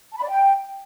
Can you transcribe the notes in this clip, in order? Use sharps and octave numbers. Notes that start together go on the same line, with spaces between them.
A5
B5
D5
G5